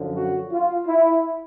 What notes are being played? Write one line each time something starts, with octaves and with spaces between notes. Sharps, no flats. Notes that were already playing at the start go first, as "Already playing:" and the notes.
Already playing: F#2 D3 F3
F#4
F4
E4